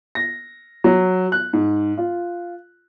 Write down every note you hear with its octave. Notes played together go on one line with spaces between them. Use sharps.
A#6
F#3
F#6
G#2
F4